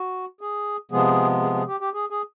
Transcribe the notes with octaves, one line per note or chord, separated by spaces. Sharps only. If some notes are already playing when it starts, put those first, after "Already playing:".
Already playing: F#4
G#4
C3 F3 G#3 B3 G#4
G#4
G#4
G4
G4
G#4
G#4